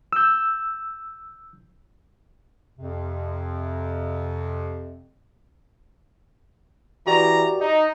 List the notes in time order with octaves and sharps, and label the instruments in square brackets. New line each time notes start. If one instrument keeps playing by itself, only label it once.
[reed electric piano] E6 G6
[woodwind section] F2 C3
[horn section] E3 A#5 [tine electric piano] F#4 G4 D5
[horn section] D#4